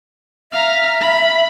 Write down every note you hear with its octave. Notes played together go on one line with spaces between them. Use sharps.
E5 F5 A#5
B5